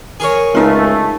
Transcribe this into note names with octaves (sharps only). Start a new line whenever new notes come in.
G#4 A#4 C#5
C#2 A3 D#4 F4